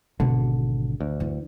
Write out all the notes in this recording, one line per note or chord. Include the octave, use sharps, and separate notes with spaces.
G#1 B2 D3 D4
D2
E3